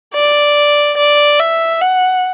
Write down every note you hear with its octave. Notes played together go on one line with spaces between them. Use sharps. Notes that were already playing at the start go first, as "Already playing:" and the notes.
D5
D5
E5
F#5